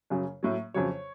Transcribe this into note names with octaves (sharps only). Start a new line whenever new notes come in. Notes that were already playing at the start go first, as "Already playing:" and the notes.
F#2 C#3 F#3
A2 F#3
F2 C#3 F#3 C#5